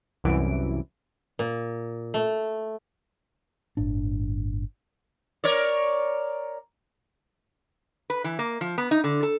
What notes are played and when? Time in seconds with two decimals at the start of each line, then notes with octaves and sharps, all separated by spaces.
0.24 C2 F#2 E3 D7
1.39 A#2
2.14 A3
3.77 G1 A2 D4
5.44 A#4 C#5 D5
8.10 B4
8.24 E3
8.39 A#3
8.61 F3
8.78 B3
8.91 D#4
9.04 D3
9.23 A4